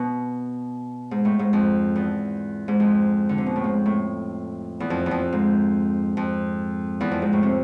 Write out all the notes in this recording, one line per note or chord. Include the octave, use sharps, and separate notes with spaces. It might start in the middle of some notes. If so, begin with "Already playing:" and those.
Already playing: B2
G#2
A2
G#2
F2
E2
G#2
F2
D3
C3
B2
A2
G#2
A2
E2
F2
E2
F2
G#2
F2
E2
F2
G#2
A2
C3